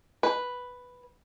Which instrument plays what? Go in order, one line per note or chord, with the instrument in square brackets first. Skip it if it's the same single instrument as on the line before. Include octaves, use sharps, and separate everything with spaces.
[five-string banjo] B4